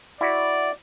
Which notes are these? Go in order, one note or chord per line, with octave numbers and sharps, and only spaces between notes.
E4 F#4 D5